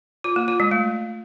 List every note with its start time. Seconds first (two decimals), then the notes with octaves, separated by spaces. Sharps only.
0.24 F4
0.36 A#3
0.48 F4
0.60 G#3
0.71 A3